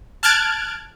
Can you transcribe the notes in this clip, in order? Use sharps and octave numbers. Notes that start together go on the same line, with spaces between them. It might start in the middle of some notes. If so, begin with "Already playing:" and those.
A5 F6 F#6 G#6 A6 D7